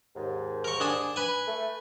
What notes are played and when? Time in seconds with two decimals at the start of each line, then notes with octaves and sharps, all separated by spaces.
0.16 D#2 G#2
0.64 A#4 C#6
0.80 D4 G#4 A5
1.16 B4 G#5
1.47 A3